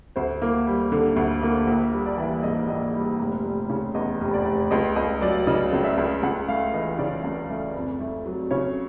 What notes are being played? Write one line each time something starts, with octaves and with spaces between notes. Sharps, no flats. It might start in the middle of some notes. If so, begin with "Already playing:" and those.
D2 C5
A#3
G3
D3
D2
A#3
A#1
G3
D5
E3
G#2 D#5
A#1 D#5
G3
F1
F1
C#3
E2 D#5
F1
D5
F1
C#2 D#5
C#2 D#5
F#3 D5
C#3 D#5
C#2
E5
C#2
C#2 F#5
A3 F5
E3 D#5
C#3 D5
C#2
A3
F2
A3
F#3
C#3 C#5